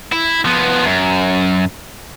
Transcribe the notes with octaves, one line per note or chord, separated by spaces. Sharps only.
E4
F3 B3
F#2